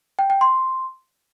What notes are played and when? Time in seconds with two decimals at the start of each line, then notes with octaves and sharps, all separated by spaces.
0.19 G5
0.30 G5
0.41 C6